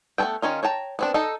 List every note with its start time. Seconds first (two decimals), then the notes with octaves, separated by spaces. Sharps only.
0.18 A3 B3 C#4 A4 G5
0.42 D#3 C#4 D#4 F4
0.63 C#5 G5 A5 A#5
0.99 B3 C4 D4
1.14 D#4 A4 D#5